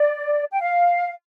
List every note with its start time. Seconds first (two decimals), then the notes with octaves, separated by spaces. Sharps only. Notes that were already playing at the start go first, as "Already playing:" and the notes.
Already playing: D5
0.51 G5
0.61 F5